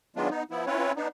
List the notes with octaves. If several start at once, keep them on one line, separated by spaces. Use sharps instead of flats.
D#3 F#3 G#3 B3 D4 F4
B3 D#4
F3 B3 E4
C4 C#4 E4 F4 B4 C#5
B3 D4 D#4